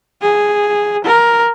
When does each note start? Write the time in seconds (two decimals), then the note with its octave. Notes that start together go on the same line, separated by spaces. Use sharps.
0.22 G#4
1.05 A#4